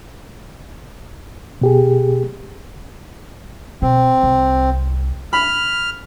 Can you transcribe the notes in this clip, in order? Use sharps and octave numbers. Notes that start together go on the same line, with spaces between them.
B2 G4 G#4
B2 C4
C2
B5 F6